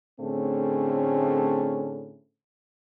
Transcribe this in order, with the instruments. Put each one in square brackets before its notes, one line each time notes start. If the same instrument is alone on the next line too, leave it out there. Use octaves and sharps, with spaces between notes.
[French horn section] A2 D3 A3 C4 C#4 G#4